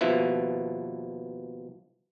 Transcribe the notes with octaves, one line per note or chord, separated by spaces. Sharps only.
D#2 B2 F3 E4 B4